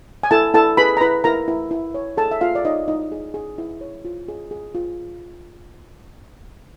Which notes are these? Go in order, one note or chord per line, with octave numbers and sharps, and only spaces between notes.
G#5
E4 A4 A5
E4 A4 A5
G#4 B4 B5
A#5
E4 B4 B5
E4 A#4 A#5
E4
E4
C#5
G#4 A4 A5
E5
F4 G#4 F5
D5
D#4 C#5 D#5
D#4 E4 D#5
G#4
G#4
E4
C#5
F4
G#4
G#4
F4